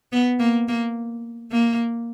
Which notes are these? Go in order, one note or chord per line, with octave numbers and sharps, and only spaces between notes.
B3
A#3
A#3
A#3